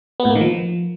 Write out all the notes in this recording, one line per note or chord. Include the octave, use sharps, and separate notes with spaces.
B3
A2
A#3
D#3
F3